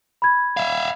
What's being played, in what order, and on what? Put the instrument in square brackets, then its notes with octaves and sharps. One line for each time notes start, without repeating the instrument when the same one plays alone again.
[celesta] B5 G#6
[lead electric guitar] E5 F5